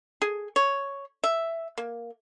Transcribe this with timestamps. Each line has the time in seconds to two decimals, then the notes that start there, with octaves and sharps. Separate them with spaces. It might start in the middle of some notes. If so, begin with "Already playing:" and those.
0.22 G#4
0.56 C#5
1.24 E5
1.78 A#3